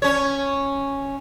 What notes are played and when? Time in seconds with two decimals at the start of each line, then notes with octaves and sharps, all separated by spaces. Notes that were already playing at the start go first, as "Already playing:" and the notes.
0.02 C#4 C#5